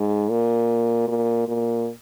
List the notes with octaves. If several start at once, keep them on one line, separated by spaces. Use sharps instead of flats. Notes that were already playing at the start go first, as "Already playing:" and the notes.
Already playing: G#2
A#2
A#2
A#2